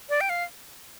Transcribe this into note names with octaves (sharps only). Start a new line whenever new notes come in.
D5
G5
F5